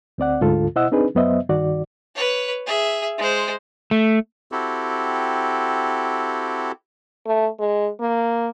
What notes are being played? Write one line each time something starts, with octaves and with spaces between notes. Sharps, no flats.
D2 C4 D5 F#5
D2 G#2 D3 F4 A4
B2 E4 C5 D#5 F#5 E6
C4 D4 D#4 G#4 B4
F#2 F#3 B3 C5 D#5 E5
G2 D#3 F#4 D5
B4 C#5
G#4 E5
G#3 C5
A3
C4 E4 F#4 G4 A4
A3
G#3
A#3